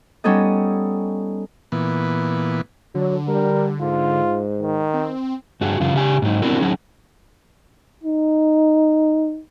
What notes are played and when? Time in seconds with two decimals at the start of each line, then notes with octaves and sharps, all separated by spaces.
0.24 G3 B3 C#4 D#4 A4 D#5
1.72 A#2 E3 B3
2.95 D3 F#3
3.28 G3 A#4
3.81 G#2 F4
4.61 D#3
4.94 C4
5.61 G2 F#4 G#4
5.80 F#2 C#3 F4
5.94 C#3 G4 G#5
6.22 G#2 F#3 D#4
6.42 B3 C4 D4 E4 F#4 A#4
6.60 F#3 C#4 D#4 G#4
8.04 D#4